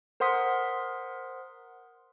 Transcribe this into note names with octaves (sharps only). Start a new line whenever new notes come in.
A#4 C5 F#5 C6 D#6 B6